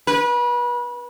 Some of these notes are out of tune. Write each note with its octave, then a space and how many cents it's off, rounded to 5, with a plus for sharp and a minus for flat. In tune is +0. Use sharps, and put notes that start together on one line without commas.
B4 -30